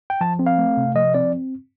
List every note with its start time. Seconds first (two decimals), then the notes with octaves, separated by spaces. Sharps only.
0.10 G5
0.21 F3 A5
0.39 C4
0.46 F5
0.58 A3
0.77 C3
0.95 F3 D#5
1.14 C4 D5